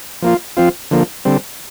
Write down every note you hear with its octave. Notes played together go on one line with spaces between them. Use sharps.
F3 A#3 F4
F3 C4 F4
D3 F3 A#3
D3 G3 C4